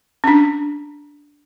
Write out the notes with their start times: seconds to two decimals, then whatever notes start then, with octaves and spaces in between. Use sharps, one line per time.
0.24 C#4 D4